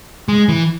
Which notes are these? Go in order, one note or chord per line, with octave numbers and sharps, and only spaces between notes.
G#3
E3